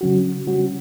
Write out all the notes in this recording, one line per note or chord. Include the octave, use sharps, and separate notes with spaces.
C#3 F#3 C#4 F#4
C#3 G3 C#4 F#4